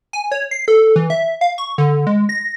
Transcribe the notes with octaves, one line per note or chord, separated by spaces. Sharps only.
G#5
C#5
C7
A4
E3
E5
F5
C#6
D3
G#3
A#6